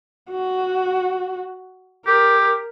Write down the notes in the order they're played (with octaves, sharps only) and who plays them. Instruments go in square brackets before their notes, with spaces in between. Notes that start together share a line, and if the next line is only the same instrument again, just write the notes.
[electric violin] F#4
[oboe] G4 [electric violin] A#4